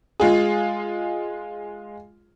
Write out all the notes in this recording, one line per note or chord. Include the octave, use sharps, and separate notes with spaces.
G#3 F4 G#4